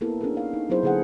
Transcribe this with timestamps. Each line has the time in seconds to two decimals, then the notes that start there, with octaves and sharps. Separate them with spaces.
0.01 A#3 B3 E4 A4 A#4
0.21 C#4 D4 E4 G#4 A#4
0.34 D#4 F5
0.53 D#4
0.70 F#3 B3 E4 G#4 C5
0.83 D3 A#3 G#4 A4 F#5